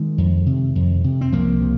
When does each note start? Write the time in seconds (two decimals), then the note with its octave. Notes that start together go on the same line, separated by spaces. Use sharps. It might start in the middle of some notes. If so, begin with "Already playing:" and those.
Already playing: D#3 G#3
0.18 F2
0.46 C3
0.75 F2
1.04 C3
1.21 C4
1.32 C2 F3 A#3
1.62 C3